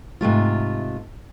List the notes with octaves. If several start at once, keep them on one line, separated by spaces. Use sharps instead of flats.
G#2 C3 A3 F4